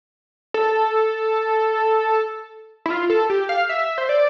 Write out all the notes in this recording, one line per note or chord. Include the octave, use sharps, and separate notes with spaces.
A4
E4
F4
A4
G4
F5
E5
C5
D5